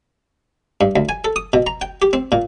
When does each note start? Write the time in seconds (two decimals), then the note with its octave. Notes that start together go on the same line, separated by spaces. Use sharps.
0.81 G2
0.96 D2
1.09 G#5
1.25 A4
1.36 D#6
1.53 B2
1.67 A#5
1.82 G5
2.02 G4
2.13 C4
2.32 A#2